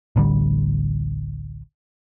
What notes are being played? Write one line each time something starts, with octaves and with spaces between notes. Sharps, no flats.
D1 A1 D3 G3